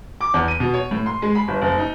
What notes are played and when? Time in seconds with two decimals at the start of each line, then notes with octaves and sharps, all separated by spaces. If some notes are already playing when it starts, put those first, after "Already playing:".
0.21 D6
0.34 E2
0.48 D#7
0.60 B2
0.74 C#5
0.91 A2
1.06 C6
1.22 G#3
1.35 B5
1.48 G1
1.62 F#1
1.78 D#4